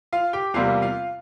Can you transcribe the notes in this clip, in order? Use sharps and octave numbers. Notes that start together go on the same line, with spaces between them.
F4 F5
G4 G5
E2 C3 G3 A#3 F4 F5
F4 F5